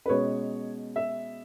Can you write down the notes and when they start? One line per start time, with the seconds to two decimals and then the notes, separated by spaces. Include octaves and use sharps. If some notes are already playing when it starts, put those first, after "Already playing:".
0.06 B4
0.09 B2 G#3 C#4 C#5
0.96 E5